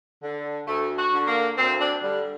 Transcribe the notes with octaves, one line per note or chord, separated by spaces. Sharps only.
D3
D2 A3
F#4
D3
A#3
D2 C4
D4
D3 G3